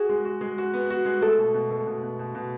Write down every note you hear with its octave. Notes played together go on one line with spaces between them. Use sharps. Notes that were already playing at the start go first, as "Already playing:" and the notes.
Already playing: F#4 G#4
G#3
F#4
G#3
F#4
B3
F#4
G#3
A3 A4
B2
B2
A3
B2
B2
B2
B2